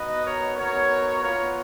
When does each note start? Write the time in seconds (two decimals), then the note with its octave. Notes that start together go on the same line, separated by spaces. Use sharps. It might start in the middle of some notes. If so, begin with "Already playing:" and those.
Already playing: B3 D#4 F#4 B4 D#5
0.25 A#4 C#5
0.58 B3 D#4 F#4 A#4 C#5
1.23 B3 F4 A#4 C#5